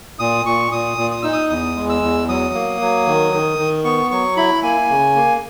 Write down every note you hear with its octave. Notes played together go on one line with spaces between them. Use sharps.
A#2 D#6
A#2 C#6
A#2 D#6
A#2
D#6
D#4 E6
D#6
E2 D#6
G#3
E6
E2
F#3 D#6
A#3
F#3
D#3
D#3
D#3
B3 C#6
F#3 C#6
E4 B5
A#3 G#5
C#3
A#3